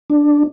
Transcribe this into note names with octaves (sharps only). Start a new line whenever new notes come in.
D4